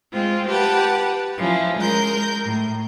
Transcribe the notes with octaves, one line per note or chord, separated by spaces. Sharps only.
G#3 C4 F4
G4 B4 F#5 A5
F3 C#4 E4
G#3 A#4 G6
A2